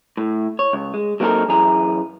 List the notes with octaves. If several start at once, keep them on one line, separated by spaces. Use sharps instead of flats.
A2
C#5
C#2
G#3
F#3 A#3 C4 D#4 A4 A#4
F#2 E3 G#4 A#5